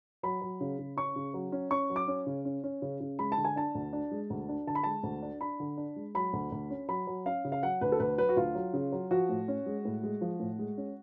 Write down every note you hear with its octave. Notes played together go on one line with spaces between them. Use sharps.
F#3 B5
F#3
C#3
C#3
C#4 C#6
C#3
F#3
C#4
C#4 C#6
F#3
D6
C#4
C#3
C#4
C#4
C#3
C#3
G#3 B5
A5
D3
G#5
D4 A5
D2
D4
G#3
D2
D4
D3 A5
B5
G#3 A5
D2
D4
D4 B5
D3
D4
G#3
F#3 B5
D2
D2
C#4
F#3 B5
F#3
C#4 F5
C#3
F5
F#3 F#5
D2 B4
A4
D2 B4
F#3 B4
F#4
D2 F4
F#3
C#3
F#3
F3 F#4
A2
C#4
G#3
A2
G#3
F3
A2
G#3
C#4